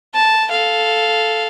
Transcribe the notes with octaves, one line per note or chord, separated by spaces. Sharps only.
A5
A4 F5